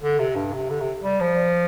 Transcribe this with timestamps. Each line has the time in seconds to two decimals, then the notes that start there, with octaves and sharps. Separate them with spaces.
0.02 D3
0.19 C3
0.35 G2
0.53 C3
0.70 D3
0.81 C3
1.04 G3
1.20 F3